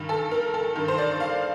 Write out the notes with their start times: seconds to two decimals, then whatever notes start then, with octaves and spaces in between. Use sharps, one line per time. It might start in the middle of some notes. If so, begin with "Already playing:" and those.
Already playing: G2 D#3
0.09 A4
0.31 A#4
0.54 A4
0.75 G2 D#3
0.88 C5
0.98 D5
1.20 F5